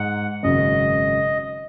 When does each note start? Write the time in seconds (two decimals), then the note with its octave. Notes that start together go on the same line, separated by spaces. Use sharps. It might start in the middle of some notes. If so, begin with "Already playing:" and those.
Already playing: G#2 D#4 G#4 F#5
0.43 G#1 F#2 C#3 D#5